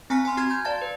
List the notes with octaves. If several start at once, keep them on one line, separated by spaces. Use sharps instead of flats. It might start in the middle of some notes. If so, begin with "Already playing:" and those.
C4 G#5 A#5 F6 F#6 B6
G#5 A#5 C6 F6
F#4 A#5 C6 F6 G#6
C6 G6 G#6
D5 F5 A5 A6
B4